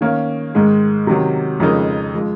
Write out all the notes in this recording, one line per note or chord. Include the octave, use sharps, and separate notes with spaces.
D#3 A#3 C#4
G#2 D#3 G#3
C3 D#3 F#3
F2 C#3 G#3 D#4 A#4
F3 G#3